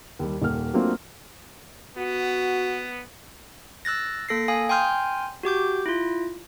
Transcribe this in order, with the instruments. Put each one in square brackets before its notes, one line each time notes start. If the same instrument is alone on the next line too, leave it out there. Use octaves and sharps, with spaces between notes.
[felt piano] D#2 G3
D#1 A#3 F6
F#3 A3 A#3 C4 D4 F4
[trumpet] B3 [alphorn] F#4
[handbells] E6 F#6 A6 A#6
A#3 A4 A#6 C7
F5 G#5 D#6
G5 G#5 C6 F6 G6
F#4 G4 D6 G6
E4 F4